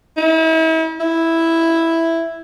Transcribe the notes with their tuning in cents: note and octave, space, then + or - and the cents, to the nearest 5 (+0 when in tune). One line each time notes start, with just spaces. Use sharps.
E4 -40
E4 +0